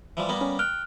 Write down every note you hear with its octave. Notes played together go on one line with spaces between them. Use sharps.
E3 F3 G3
G3 A#3 B3
C#4
G5 F6 F#6